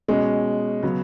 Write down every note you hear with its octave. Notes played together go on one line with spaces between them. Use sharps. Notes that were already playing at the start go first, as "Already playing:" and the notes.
B2 G#3 C#4
C#3 F#3 B3